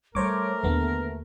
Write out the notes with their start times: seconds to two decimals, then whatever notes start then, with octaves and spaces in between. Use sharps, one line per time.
0.15 G3 A3 A#4 C5 C#5 D6
0.63 D#2 D3 B3